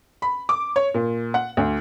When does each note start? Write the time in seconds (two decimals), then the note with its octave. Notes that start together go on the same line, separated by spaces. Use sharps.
0.22 B5
0.49 D6
0.76 C#5
0.94 A#2
1.34 F#5
1.57 D2